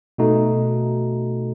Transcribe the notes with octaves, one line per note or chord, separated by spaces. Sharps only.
B2 A3 D#4 F#4 A4